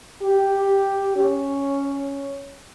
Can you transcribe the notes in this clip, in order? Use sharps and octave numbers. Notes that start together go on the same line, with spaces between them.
G4
C#4